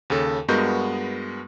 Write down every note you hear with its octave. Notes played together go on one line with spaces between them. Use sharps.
D#2 C#3 A4
G2 G#3 B3 F#4 A#4 G6